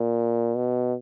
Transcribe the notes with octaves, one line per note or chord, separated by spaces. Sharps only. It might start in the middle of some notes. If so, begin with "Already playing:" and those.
Already playing: A#2
B2